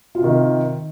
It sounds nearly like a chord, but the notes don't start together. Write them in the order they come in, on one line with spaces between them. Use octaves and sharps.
F4 C3 D#3